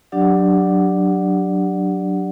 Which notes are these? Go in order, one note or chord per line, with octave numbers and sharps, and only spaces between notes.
F#3 D4 G4 D5 F#5